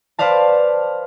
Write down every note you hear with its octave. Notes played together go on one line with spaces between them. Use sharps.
B4 C5 D5 F5 A5